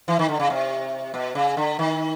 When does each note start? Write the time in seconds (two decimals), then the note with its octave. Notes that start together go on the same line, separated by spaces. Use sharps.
0.08 E3
0.19 D#3
0.29 D3
0.39 C#3
0.50 C3
1.14 B2
1.35 C#3
1.57 D3
1.79 D#3